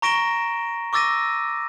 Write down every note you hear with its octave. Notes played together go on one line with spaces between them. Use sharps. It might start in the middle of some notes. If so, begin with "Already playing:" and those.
A#5 C#6 A#6 D7 E7 G7
C#6 D6 E6 A6 A#6 D#7